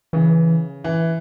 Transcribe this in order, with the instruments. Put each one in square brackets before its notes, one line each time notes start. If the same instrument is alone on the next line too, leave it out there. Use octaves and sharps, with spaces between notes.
[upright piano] C#3 [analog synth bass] E3
[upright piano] E3